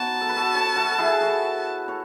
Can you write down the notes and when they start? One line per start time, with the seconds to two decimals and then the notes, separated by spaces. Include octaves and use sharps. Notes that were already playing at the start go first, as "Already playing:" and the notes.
Already playing: B3 D#4 F#4 A5
0.21 A4
0.29 B4
0.37 F#4 A4
0.54 A4 C#5
0.76 F#4 A4
0.91 A4
0.98 E4 G#4
1.21 F#4 A4
1.88 A4 C#5